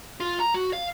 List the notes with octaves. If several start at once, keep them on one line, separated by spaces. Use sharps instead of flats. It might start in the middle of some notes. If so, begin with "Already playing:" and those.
F4
A#5
F#4
F5